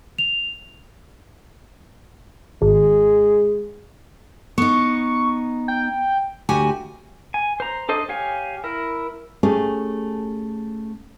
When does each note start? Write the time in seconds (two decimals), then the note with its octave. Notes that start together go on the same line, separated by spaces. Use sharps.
0.18 F7
2.62 G#1 G#3
4.58 B3 D#4 C#6
5.68 G5
6.49 D2 F#4 G4 G#5
7.34 G#5
7.60 C5 A#5
7.89 D4 A4 C5 D#5
8.09 G4 C#5 F5 G#5
8.64 E4 A#4
9.43 A3 C#4 G4 G#4